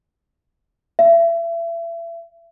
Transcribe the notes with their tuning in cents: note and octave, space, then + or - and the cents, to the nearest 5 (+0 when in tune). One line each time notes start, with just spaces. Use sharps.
E5 +35